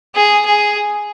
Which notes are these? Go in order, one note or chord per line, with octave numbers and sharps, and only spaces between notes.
G#4
G#4